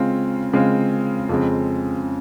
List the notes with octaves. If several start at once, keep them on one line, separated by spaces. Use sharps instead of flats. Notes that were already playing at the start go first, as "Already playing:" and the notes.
Already playing: C#3 G#3 C4 F4
C#3 G#3 C4 F4
F2 C#3 G#3 C4